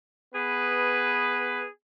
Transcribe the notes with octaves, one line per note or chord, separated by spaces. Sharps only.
B3 G#4 B4